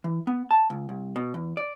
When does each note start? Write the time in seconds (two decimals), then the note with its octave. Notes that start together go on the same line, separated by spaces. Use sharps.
0.04 E3
0.27 B3
0.51 A5
0.70 C#2
0.89 C2
1.16 B2
1.34 E2
1.57 D5